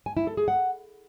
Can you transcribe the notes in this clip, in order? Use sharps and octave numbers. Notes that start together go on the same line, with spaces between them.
G#5
E4
A4
G#4
F#5